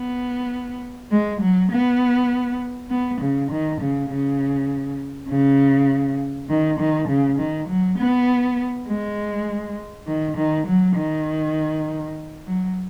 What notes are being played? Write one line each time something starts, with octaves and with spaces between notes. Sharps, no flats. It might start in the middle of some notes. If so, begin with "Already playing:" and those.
Already playing: B3
G#3
F#3
B3
B3
C#3
D#3
C#3
C#3
C#3
D#3
D#3
C#3
D#3
F#3
B3
G#3
D#3
D#3
F#3
D#3
F#3